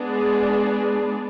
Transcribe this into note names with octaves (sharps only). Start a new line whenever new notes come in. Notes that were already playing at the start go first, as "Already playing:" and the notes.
Already playing: G#3 B3 D4 G#4 D5